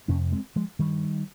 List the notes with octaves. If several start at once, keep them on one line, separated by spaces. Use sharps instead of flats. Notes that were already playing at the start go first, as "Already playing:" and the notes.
F2 C3 A#3 C#4
G#3 C4
F3 G#3
G2 D#3 G3